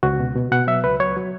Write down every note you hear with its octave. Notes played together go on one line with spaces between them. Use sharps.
C#2 F#4
B2
B2
B2 F#5
F#3 E5
C#2 B4
F#3 C#5
F#3